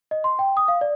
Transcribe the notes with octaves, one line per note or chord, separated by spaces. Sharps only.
D#5
C6
G5
D#6
F5
D5